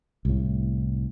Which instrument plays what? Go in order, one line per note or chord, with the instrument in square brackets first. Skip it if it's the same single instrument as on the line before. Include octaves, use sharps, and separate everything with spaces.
[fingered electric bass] C2 A2